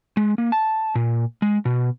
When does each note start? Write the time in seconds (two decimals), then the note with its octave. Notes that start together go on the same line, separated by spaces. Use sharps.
0.17 G#3
0.38 A#3
0.52 A5
0.95 A#2
1.42 G#3
1.65 B2